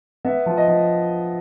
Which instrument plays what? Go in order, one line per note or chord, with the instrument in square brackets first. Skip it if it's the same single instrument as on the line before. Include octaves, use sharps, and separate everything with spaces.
[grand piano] B3 E5
F3
D#5
F3